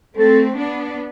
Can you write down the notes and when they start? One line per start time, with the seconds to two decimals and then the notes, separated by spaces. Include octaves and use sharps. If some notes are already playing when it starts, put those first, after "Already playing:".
0.16 A3 C4 A4
0.57 B3 D4